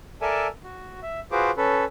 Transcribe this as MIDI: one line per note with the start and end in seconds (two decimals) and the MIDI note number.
0.22 0.47 69
0.22 0.47 70
0.22 0.47 74
0.22 0.47 76
0.22 0.47 80
0.22 0.47 81
0.64 1.00 66
1.02 1.20 76
1.32 1.51 65
1.32 1.51 66
1.32 1.51 68
1.32 1.51 71
1.32 1.51 72
1.32 1.51 86
1.57 1.85 61
1.57 1.85 69
1.57 1.85 71